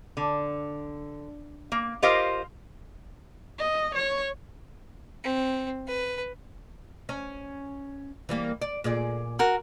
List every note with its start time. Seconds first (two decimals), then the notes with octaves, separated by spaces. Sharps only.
0.17 D3
1.72 A#3
2.03 F4 G4 A#4 C5 D#5 F5
3.58 D#5
3.95 C#5
5.24 C4
5.88 B4
7.09 C#4
8.29 E3 G3 A#3
8.61 D5
8.84 A#2 G#4 D5
9.39 F#4 A#4